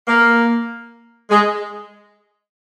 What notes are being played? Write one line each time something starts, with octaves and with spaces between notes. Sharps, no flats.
A#3
G#3